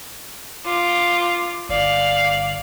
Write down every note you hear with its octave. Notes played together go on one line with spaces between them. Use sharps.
F4 D6
G1 D5 F5